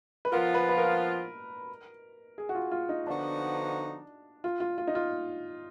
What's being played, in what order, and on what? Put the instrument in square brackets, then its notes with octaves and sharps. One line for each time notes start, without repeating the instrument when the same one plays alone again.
[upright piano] B4
[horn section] F3 B3 F4 [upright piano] A#4
[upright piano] B4
B4
A#4
G#4
F#4
F4
F4
D#4
[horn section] D3 F3 B3 D#4 F#4 [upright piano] D4
[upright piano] F4
F4
F4
D#4
F4